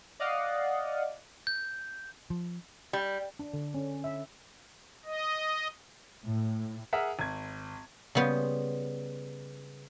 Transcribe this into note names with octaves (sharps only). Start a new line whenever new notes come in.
D5 D#5 F5 F#5
G6
F3
G3
D4
D3
C#4
E5
D#5
A2
G#4 A#4 E5 F#5
G#1 G#6
C#3 G3 B3 C5